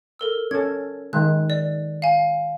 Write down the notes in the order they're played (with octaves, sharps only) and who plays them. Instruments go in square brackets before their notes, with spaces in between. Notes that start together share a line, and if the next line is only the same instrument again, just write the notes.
[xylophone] A4 A#4 E6
[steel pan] C#4 A4 [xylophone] G#6
[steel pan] D#3 G#3 [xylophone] F#6
[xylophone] D5
F5 G#5